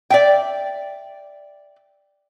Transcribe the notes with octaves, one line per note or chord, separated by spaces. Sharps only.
D5 E5 G5